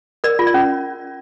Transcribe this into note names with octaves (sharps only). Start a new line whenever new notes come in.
A#4 D5
F4
D5
C#4